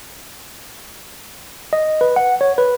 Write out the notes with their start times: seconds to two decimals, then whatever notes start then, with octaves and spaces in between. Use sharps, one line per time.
1.73 D#5
2.01 B4
2.16 F#5
2.41 C#5
2.58 B4